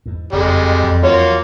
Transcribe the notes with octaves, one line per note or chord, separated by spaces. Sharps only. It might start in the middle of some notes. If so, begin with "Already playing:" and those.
E2 G#2
F#1 F2 G3 G#3
E2 F3 F#3
A#3 F4 F#4 C#5